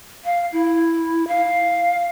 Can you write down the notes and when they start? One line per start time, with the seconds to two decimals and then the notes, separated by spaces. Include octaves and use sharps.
0.25 F5
0.52 E4
1.28 F5